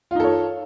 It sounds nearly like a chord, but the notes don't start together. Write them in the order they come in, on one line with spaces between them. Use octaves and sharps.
F4 D#4 A4 C#5